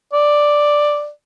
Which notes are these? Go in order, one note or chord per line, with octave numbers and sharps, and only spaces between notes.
D5